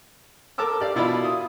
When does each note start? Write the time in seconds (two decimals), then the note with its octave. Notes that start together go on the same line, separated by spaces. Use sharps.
0.58 A4 A#4 A5 D6 E6
0.80 G4 D5 F5
0.96 B2 E4 F4 D5 F5 B5
1.25 D#6